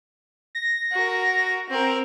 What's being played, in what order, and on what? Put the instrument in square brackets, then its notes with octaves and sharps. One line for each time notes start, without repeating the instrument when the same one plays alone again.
[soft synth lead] A#6
[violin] F#4 A#4
C4 A#4